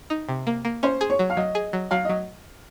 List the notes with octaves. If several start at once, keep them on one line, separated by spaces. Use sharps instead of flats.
D#4
C3
A#3
A#3
C#4 C5
G#4
C#5
F#3
F5
F#3 D#5
G#4
F#3
F#3 F5
D#5
F#3